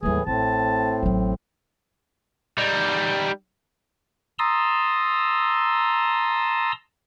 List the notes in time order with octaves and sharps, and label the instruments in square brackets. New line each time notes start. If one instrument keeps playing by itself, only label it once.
[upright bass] D#2 G3 [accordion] A2 E3 [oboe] G#4
[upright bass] A1 [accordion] A2 C4 [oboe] A5
[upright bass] A1 F#3
[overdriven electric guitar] G3 D#4
[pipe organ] A5 A#5 C6 D#6 E6